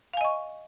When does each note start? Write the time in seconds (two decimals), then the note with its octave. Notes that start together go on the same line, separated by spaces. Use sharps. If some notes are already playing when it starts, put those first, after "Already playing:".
0.14 F5
0.17 G#5
0.21 D#5
0.24 C#6